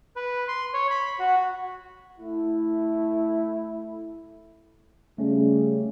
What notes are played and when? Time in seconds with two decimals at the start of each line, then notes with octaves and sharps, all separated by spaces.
0.16 B4
0.48 C6
0.74 C#5
0.90 B5
1.19 F#4
2.20 A3 E4
5.18 C#3 G3 A3 C#4